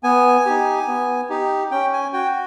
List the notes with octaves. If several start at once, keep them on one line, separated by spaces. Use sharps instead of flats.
B3 G#5
D#4 G4
B3
D#4 G4
C#4 G5
G#5
F#4 G5